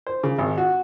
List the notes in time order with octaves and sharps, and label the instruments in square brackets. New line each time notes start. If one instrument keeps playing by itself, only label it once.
[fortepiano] C5
C#3
G#1
F#4